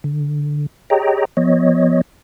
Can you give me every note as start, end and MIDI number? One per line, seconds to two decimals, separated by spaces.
0.04 0.66 50
0.90 1.25 67
0.90 1.25 68
0.90 1.25 73
0.90 1.25 75
0.90 1.25 79
0.90 1.25 82
1.37 2.01 53
1.37 2.01 59
1.37 2.01 73
1.37 2.01 75